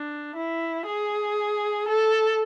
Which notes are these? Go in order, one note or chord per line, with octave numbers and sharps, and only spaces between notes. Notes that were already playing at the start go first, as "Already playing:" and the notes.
Already playing: D4
E4
G#4
A4